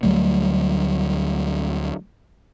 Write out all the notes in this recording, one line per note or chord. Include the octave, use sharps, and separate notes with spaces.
D2 F#3 G3 A3